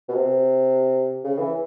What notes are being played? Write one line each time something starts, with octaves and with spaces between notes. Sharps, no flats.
B2
C3
C#3
E3